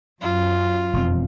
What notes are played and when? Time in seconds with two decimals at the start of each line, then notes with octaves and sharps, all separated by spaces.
0.22 F#2 F4
0.93 E1 F2 C4